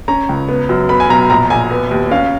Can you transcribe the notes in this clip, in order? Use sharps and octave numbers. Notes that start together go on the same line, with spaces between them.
C#4 A#5
C#2
B3
F#2
B3 B5
G#5
B1 A#5
A#1 A#5
A#1 G#5
B3
D#2
C#4 F5